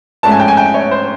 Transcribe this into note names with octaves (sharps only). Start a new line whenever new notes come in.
G#2 F3 A3 C#4 A5
G#5
G5
G#5
G5
C#5
C5